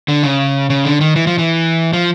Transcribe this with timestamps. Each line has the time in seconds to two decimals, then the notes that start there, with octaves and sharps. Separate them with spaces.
0.08 D3
0.23 C#3
0.70 C#3
0.85 D3
1.01 D#3
1.16 E3
1.27 F3
1.38 E3
1.93 F3